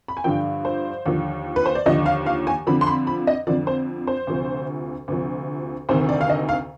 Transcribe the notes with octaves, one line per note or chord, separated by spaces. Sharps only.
B5
G#5
G2 D3 F3 G5
C5
D#2 D3 F3
B4
C5
D5
D#2 D3 F3 D#5
F5
F5
G#5
F2 D3 F3 B5
C6
B5
B5
D#5
F2 D3 F3 D5
C5
C5
D2 C3 F3
D2 C3 F3
D2 C3 D#3 C5
D5
F5
D#5
F5